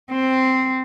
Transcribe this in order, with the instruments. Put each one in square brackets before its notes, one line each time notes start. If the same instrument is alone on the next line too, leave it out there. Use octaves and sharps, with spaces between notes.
[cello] C4